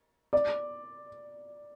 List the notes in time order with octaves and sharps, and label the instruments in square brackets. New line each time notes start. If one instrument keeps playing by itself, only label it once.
[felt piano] D5